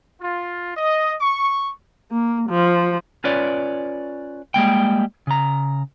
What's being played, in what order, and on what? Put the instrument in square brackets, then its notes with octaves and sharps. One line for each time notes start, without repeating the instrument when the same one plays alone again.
[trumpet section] F4
D#5
C#6
[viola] A#3
F3
[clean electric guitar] C#4 F4 B4 C#5 D5
G3 G#3 A#3 G5
C#3 A#5